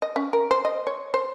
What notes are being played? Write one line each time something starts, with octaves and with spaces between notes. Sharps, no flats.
D#5
C#4
A#4
C5
D#5
C#5
C5